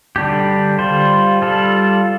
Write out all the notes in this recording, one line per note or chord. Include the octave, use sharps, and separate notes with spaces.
D3 G3 D4 G4
G3 F4 C5
G3 F4 A4